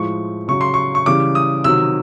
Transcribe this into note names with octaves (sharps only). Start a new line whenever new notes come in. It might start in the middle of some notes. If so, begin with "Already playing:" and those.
Already playing: A2 F3 G#3 C#6
C#3 F#3 C#6
C6
C#6
C#6
C#3 E3 G3 D6
D#6
C3 D#3 F#3 E6